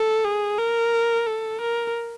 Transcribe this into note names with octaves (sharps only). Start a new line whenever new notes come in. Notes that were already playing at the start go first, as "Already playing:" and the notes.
Already playing: A4
G#4
A#4
A4
A#4